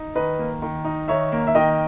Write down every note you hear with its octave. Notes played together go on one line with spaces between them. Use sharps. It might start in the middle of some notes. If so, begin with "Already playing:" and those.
Already playing: D#4
D#3 B4 D#5
A#3
D#3
D#4
D#3 C#5 E5
A#3
E5
D#3 D#5 G5